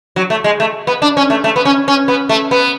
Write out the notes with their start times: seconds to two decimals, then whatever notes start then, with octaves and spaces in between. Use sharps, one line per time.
0.16 F#3
0.30 A3
0.44 G#3
0.60 A3
0.87 B3
1.02 D4
1.17 C#4
1.30 A3
1.44 A3
1.56 B3
1.65 C#4
1.88 C#4
2.08 B3
2.29 A3
2.51 B3